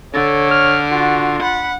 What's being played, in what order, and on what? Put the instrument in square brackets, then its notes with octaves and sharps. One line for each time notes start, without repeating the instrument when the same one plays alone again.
[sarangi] D3 [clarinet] A4 [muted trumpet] C#5
[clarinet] F6
[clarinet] F4 [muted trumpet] F#4
[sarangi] F#5 [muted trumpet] B5